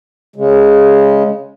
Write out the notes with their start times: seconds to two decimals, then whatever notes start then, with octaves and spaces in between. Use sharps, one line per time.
0.36 C#3 G#3